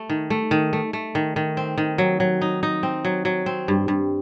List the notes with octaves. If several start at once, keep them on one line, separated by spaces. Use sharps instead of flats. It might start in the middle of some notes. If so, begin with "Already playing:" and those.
Already playing: A3
D#3
A3
D#3
A3
A3
D#3
D#3
C4
D#3
F#3
F#3
D#4
D#4
C4
F#3
F#3
C4
G2
G2